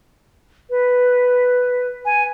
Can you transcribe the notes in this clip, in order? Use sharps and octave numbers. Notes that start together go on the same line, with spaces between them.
B4
G#5